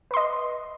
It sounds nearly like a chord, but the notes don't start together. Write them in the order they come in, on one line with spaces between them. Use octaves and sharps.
B4 C6 D#5